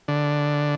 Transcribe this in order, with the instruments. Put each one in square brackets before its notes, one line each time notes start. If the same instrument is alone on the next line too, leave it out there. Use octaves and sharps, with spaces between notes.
[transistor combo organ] D3